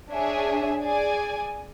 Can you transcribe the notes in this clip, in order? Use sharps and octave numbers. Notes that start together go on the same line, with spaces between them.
D4 G#4 C#5 E5 G#5
G#4 D5 G#5